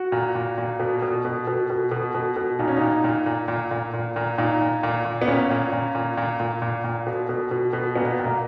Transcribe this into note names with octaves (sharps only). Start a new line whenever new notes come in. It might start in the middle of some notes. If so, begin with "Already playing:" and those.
Already playing: F#4
A#2
A#2
A#2
B2
B2
B2
B2
B2
B2
B2
B2
A#2 D#4
C#4
A#2 D#4
A#2
A#2
A#2
A#2
A#2
A#2
A#2 D#4
A#2
A#2
A#2
B3
A#2 C#4
A#2
A#2
A#2
A#2
A#2
A#2
A#2
B2
B2
B2
B2
A#2 B3
A#2
A#3